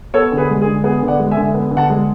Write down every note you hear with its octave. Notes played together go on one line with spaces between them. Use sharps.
B3 A4 C#5
D3
G#4 B4
G#3
G#4
D3
B3 G#4
D3
D5 F#5
G#3
E5 G#5
D3
B3
D3
F#5 A5
G#3